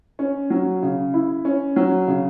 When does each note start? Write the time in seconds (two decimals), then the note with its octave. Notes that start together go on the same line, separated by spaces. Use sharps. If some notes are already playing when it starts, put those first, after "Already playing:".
0.19 C#4
0.50 F#3
0.82 C#3
1.14 E4
1.45 C#4
1.76 F#3
2.07 C#3